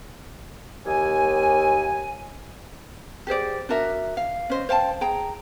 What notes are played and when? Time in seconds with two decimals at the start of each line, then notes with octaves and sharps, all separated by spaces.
0.86 D#2 G#5
3.27 G4 G#4 C5 D5
3.69 D4 F#4 A#4 E5
4.17 F5
4.50 C#4 C5 D#5
4.69 C5 F5 G5 A5
5.01 G#4 G5 A#5